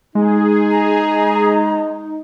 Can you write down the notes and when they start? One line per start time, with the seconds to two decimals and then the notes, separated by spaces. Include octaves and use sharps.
0.15 G#3 D#4 G#4
0.71 A#5